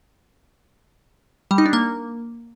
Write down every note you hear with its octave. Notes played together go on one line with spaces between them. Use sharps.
G3
D#4
D4
A#3